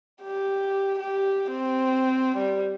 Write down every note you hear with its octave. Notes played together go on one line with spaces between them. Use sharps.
G4
G4
C4
G3